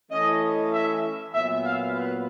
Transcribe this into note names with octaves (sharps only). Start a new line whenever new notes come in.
E3 A3 C#4 D#5
E5
A#2 F#3 B3 E5
F5
B4